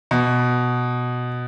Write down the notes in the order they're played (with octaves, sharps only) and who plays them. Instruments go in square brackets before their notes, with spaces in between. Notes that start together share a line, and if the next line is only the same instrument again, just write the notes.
[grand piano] B2